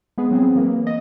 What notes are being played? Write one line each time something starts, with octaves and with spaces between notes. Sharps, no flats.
G#3 B3 G#4
F#3 C4 G#4
E3 F#3 A#3
D#5